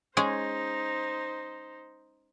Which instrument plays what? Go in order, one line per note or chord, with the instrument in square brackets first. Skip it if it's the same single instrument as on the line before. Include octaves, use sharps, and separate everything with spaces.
[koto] G#3 C#4 G#4 [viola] D#4 C5